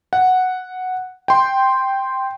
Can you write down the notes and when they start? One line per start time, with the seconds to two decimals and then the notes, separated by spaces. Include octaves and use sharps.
0.13 F#5
1.28 G5 C6